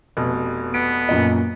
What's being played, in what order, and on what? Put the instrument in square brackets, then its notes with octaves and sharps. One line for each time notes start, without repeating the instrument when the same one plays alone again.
[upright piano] F1 B2
[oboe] B3 [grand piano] D7
[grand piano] F#2 A#2 D#5